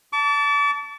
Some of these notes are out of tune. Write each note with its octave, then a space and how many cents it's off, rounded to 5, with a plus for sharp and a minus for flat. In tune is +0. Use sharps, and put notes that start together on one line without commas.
A5 +0 D6 -40